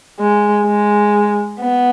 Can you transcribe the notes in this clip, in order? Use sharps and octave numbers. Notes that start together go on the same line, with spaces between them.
G#3
G#3
B3